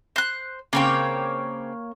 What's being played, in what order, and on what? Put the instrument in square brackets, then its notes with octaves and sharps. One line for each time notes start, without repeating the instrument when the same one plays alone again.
[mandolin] C5 F#6
[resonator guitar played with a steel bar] C#3 C4 [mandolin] A#3 C#5 G5